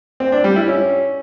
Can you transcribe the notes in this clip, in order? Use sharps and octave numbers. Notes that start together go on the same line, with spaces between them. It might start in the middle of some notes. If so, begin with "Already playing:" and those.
C4
D4
G3
E4
C#4